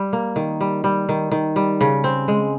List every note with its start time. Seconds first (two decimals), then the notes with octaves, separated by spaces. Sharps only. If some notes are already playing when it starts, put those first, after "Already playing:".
Already playing: G3
0.13 A#3
0.36 D#3
0.61 G3
0.84 G3
1.09 D#3
1.32 D#3
1.56 G3
1.81 C#3
2.04 C4
2.28 G#3